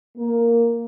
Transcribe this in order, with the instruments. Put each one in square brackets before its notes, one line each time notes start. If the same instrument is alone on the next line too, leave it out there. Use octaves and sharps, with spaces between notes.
[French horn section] A#3